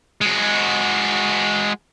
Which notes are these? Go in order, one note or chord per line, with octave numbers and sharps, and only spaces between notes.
G#3 F#4